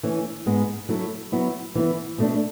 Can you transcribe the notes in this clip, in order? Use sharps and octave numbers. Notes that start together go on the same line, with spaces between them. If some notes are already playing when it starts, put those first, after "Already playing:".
E3 A3 C#4
G#2 G#3 B3
F#3 A3 E4 A4
F#3 B3 E4
E3 B3 E4
B2 A3 D4